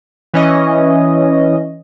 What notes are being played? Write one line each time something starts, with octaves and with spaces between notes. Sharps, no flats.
E3 C#4 D#5